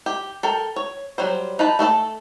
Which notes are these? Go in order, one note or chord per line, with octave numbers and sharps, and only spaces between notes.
G4
A4 A#4 G5
C#5
F#3 G3 C5
D#4 B4 A5 B5
A3 A4 D5 A5